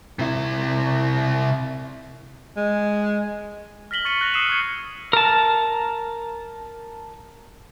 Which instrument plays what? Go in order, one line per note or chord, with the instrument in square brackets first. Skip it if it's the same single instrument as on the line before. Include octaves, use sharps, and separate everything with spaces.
[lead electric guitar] C3 E4
[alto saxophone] G#3
[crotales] F6 A#6 B6 F#7 G7
C#6 A6 C#7 D#7 F#7
F#6 A#6 C#7 F7
D#6 E6 C7 C#7 D#7 E7
C#6 D#6 G#6 C#7
[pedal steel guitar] A#4 A5